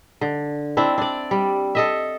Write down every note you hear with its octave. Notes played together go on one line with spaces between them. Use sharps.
D3
C4 D4 E4
D4 D5
G3
A4 D#5 E5